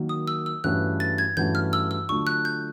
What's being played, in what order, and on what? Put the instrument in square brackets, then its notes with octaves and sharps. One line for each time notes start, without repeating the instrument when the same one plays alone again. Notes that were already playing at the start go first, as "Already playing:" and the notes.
Already playing: [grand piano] D#3 F#3 A#3
[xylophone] D#6
E6
E6
[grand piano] G2 E3 A3 C#4 F#4 [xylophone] F#6
[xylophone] A6
G#6
[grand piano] G2 E3 A3 C#4 F#4 [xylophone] G6
[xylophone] F6
E6
E6
[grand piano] D3 F#3 A3 D4 F4 [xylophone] C#6
[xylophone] F#6
G6